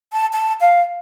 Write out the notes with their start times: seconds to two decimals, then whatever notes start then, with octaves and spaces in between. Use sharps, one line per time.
0.13 A5
0.33 A5
0.61 F5